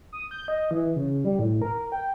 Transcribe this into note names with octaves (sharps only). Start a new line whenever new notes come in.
D#6
G6
D#5
E3
C#3
G3
A2
A#4
G5